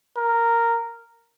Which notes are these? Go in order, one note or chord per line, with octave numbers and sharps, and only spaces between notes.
A#4